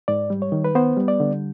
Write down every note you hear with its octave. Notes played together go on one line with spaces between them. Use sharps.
G#2 D5
G3
C#5
D#3
B4
B3 C5
G3
D5
D3